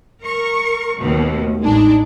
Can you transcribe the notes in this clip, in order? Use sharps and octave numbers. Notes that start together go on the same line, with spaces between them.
A#4 C#6
D#2 B2
A3
A1 G#3 D4 D#4